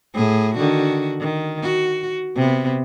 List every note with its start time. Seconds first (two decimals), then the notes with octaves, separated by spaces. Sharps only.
0.14 A2 G#4
0.55 D3 D#3 F#4
1.20 D#3
1.62 F#4
2.36 C3 B3